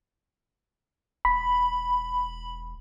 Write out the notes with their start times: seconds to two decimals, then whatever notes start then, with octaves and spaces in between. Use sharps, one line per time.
1.25 E1 B5